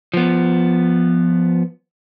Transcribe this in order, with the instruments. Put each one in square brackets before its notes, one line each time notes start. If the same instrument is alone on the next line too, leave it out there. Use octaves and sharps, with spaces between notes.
[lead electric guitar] F3 B3